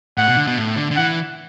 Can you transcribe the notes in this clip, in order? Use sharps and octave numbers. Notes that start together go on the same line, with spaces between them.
A2 F#5
B2
D3
B2
A2
D3
D3
E3 F#5